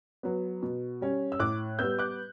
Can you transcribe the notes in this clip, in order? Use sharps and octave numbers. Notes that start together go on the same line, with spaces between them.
F#3 B3
B2
G3 C#4
E6
A2 D6 F#6
G3 B3 E6 G6
D6 F#6